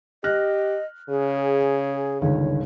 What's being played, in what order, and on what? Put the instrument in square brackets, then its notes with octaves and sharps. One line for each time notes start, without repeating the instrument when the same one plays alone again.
[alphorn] G4 [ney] D#5 [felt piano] F6 F#6 A#6
[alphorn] C#3 [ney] G#4
[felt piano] G1 C#2 D#3 [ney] C#5